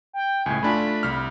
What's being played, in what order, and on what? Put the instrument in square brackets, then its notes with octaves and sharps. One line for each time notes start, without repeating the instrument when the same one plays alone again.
[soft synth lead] G5
[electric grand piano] C#2 A2 [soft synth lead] G#5
[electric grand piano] A3 D4 F4 [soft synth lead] B5
[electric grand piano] C2 F6